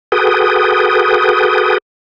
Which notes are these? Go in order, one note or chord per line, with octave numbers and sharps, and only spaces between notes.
F#4 G#4 A4 B4 G5 D#6